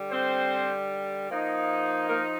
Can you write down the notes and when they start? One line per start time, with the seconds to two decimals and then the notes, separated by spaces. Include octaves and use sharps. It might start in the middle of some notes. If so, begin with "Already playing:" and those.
Already playing: D3 G3
0.11 C4 C5
1.30 F3 A#3 D#4
2.09 A#3 A#4